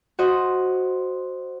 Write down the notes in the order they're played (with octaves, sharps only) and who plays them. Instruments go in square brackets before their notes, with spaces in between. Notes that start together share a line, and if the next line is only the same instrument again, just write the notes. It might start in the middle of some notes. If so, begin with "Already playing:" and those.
[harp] F#4 C5 D#5